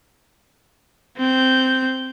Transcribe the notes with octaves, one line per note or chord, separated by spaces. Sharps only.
C4 G6